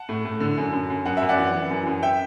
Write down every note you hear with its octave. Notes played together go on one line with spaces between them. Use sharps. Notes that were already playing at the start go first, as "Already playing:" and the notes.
Already playing: F#5 A5
A2
A2
D3
F#2
F#2
F#2
F#2 F#5
F#2 E5
D5 F#5
E3
E3
F#2
F#2
E5 G5